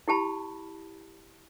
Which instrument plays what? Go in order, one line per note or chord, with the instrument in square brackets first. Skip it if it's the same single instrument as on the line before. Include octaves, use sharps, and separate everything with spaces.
[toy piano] E4 G4 A5 B5